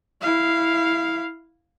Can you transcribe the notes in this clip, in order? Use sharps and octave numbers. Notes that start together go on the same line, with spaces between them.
E4 F5